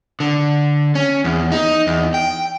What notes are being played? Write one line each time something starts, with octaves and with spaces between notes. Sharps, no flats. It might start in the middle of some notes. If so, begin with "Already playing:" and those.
D3
C#4
E2
D#4
E2
G5